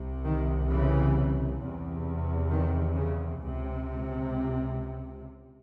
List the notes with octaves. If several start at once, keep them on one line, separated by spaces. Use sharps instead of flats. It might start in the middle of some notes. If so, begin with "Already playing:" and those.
Already playing: C2 C3
D#3
C#3 E3
E2 C3
D#3
C#3
C#2 C3